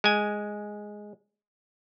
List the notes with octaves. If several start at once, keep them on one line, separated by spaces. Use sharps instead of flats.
G#3 G#5